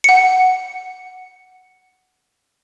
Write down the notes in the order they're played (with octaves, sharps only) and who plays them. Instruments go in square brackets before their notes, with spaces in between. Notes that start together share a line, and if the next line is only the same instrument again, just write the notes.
[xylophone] F#5 C#7